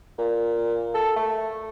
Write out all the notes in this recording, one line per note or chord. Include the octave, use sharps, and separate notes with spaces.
A#2
A4
A3